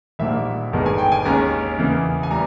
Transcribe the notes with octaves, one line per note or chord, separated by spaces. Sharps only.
A#1 G#2 D#3 G3 A#3 E5
G1 G2 D#3 G#3 B3
G#5
G5
G#5
D#2 D#3 G#3 C#4 A#5
E2 C#3 E3 A#3
G#5
E3 G3 A#5